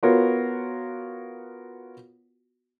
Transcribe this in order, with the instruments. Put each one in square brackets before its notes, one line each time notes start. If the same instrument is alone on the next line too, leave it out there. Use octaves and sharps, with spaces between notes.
[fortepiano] B3 F4 F#4 A#4 C#5